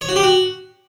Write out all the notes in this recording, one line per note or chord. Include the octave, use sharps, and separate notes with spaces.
C#5
F#4
G4
F#4